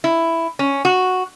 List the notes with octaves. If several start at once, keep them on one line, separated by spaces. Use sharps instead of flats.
E4
C#4
F#4